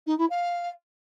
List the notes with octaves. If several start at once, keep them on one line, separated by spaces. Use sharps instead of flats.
D#4
E4
F5